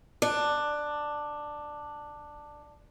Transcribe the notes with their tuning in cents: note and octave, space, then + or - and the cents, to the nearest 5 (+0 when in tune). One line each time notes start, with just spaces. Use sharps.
D4 +10